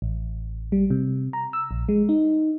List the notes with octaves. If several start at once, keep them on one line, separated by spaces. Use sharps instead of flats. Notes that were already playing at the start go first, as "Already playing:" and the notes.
A1
G3
C3
A#5
E6
A#1
G#3
D#4